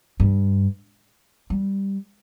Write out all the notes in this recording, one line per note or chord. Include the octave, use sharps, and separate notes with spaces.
G2
G3